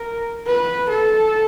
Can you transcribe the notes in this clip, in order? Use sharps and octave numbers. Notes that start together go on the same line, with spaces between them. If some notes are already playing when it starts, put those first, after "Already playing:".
Already playing: A#4
B4
A4